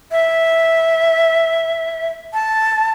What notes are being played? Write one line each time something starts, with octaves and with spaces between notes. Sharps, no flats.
E5
A5